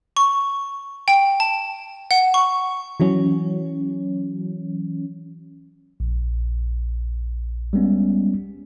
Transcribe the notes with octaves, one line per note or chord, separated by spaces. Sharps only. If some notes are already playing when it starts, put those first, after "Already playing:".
C#6
G5
A5
F#5
C#6
E3 F#3 C#4
A#1
G3 G#3 B3 C#4